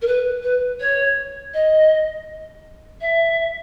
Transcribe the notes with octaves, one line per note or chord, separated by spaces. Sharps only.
A#4
B4
B4
C#5
D#5
E5